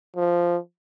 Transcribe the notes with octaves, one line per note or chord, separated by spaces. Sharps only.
F3